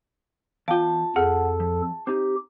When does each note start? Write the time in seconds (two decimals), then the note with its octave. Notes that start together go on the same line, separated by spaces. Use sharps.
0.68 E2 F4 F5 G5 A5
1.16 F2 G#4 A4 F#5
1.60 F3
2.07 C4 D#4 G4